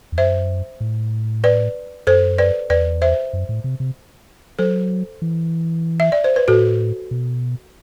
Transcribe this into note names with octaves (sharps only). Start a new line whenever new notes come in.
E2
F#2 C5 E5
A2
B4 D5
F#2 A4 C5
B4 D5
E2 B4 D5
C5 E5
F#2
A2
C3
C3
F#3 A4 C5
E3
E5
D5
C5
B4
A2 F#4 A4
B2